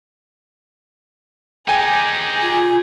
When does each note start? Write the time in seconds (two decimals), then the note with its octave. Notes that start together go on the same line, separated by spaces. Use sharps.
1.68 D#4 G4 G#4 G5 G#5
2.42 F4